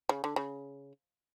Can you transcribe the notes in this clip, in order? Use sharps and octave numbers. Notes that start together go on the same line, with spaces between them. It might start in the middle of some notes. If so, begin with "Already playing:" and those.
C#3
D3
C#3